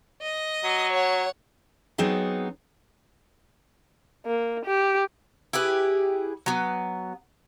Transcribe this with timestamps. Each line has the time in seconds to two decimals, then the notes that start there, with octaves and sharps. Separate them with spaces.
0.22 D#5
0.64 F#3
0.93 C#5 F#5
1.98 F#3 B3 C4 D#4 G#4
4.26 A#3
4.65 G4
5.53 E4 G4 G#4 B4
6.46 F#3 B3